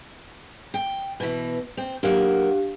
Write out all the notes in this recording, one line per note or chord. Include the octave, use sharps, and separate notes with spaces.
G5
B2 E3
C4
F#3 A#3 D4 G4 F5